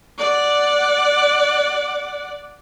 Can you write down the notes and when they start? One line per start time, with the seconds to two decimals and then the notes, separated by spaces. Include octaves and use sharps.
0.18 D5 F#5